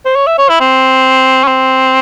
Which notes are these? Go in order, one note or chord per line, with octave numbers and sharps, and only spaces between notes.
C5
C#5
E5
C#5
E4
C4
C#4
C4